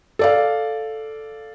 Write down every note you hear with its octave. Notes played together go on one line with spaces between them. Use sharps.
A4 D5 F5